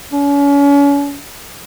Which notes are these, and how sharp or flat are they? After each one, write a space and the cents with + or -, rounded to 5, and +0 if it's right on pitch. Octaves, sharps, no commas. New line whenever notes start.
C#4 +40